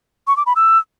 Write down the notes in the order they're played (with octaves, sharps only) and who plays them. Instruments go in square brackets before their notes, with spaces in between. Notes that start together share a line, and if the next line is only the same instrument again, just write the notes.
[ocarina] C#6
D6
B5
E6